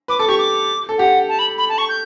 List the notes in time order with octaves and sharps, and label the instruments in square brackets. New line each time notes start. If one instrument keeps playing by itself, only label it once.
[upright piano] B4 [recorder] D6
[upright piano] A4 [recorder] D6
[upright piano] G4 [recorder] C#6
[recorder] D6
[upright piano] A4
[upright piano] G4 [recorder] F#5
[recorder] A5
B5
B5
A5
C#6
G6